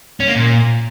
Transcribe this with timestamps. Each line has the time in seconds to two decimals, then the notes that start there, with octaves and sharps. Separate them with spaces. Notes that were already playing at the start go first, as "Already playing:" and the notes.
0.20 C#4
0.28 A#3
0.36 A#2